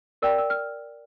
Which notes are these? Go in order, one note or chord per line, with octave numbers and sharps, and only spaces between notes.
A#4 D5 G5 E6
E6
F6